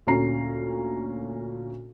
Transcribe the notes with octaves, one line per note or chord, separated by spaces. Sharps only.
D2 A#2 C#4 A#5 C7